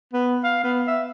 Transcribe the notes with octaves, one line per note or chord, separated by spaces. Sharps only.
B3
F5
B3
E5